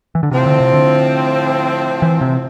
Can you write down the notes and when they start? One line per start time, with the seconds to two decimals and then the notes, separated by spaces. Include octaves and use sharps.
0.15 E3
0.23 D3
0.31 A2 C3 F3 C4
0.46 D3
0.60 C3
0.74 D3
2.02 E3
2.21 C3